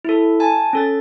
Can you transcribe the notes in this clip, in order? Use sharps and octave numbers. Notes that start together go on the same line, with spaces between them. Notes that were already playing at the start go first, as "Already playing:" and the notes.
E4 A4
G#5 A5
C#4 A4 A6